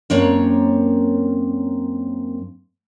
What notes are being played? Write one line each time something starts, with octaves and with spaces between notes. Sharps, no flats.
F#2 A#3 C4 D4 C#5